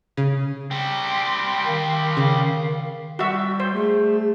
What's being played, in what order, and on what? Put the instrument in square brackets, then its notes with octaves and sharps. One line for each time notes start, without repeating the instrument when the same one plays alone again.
[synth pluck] C#3
[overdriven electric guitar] G3 C4
[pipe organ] G5 C6
D#3 F5
[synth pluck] C#3
[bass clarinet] G3 [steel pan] F#4 E5
[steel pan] C5
[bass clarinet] A3 [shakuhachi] G#4